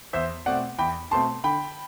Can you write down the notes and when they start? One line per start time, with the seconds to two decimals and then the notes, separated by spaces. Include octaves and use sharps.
0.13 E2 C5 E5
0.46 B2 A3 C4 D5 F#5
0.79 E2 G5 B5
1.11 B2 A3 C4 A5 C6
1.44 D3 G5 B5